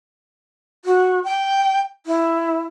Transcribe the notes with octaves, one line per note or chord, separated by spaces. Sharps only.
F#4
G5
E4